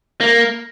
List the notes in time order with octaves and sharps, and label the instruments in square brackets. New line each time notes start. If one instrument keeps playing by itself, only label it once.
[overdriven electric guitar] A#3